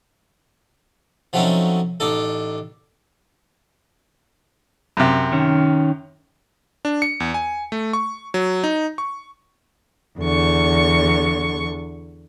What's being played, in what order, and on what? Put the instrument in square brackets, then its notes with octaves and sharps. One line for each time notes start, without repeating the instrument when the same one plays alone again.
[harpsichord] F3 F#3 A3 C4 C#4 D#4
A1 D4 D#4 A4
[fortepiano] F#2 C3
[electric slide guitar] D#3 C#4
[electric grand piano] D4
C#7
E2
G#5
A3
C#6
F#3
D#4
C#6
[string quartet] E2 D3 C#6